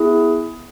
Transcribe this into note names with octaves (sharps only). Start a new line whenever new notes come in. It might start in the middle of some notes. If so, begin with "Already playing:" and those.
Already playing: B3 E4 G#4